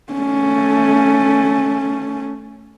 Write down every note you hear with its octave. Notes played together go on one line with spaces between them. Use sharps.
A3 C#4